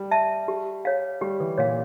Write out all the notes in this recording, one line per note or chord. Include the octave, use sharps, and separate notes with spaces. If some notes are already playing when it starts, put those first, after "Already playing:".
Already playing: G3
E5 A5
G4
C#5 F5
G3 G4
E3
A#2 C#5 F5